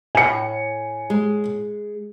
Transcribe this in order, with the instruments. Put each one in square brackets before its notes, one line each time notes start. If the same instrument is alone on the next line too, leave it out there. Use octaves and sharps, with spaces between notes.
[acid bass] A2 [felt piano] G#5 C#7
[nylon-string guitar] G#3